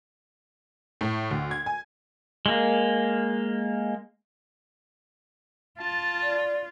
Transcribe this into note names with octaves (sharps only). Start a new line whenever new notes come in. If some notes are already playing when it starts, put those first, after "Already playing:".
A2
D2
G#6
G#5
G#3 A#3
F4 A5
D5